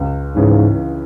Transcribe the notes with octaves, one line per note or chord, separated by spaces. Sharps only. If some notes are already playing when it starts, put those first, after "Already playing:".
Already playing: C#2
G#2 C#3 E3 C#4 G#4